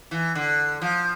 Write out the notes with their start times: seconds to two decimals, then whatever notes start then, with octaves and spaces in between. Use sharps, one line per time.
0.11 E3
0.35 D3
0.82 F3